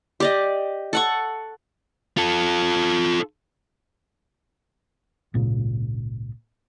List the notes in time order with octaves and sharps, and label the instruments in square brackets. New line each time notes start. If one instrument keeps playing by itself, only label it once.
[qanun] G4 D5 D#5
A4 F#5 C#6
[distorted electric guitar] F4 A4
[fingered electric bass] G#1 C#2 A#2 C#3